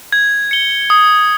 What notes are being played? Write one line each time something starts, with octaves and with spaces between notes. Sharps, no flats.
G#6
C#7 G7
D#6